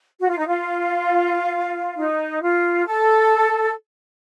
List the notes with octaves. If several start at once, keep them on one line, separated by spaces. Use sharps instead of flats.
F#4
F4
D#4
F4
D#4
F4
A4